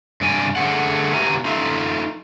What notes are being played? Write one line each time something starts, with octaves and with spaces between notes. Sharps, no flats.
G2 C3 D5 G#5
D3 A3 G#4 F#5
B2 E4 G4 B4 G#5 A#5
D#4 F4 A4 E5 F5